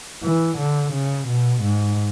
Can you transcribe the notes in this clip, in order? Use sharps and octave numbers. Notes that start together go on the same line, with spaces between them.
E3
D3
C#3
B2
G#2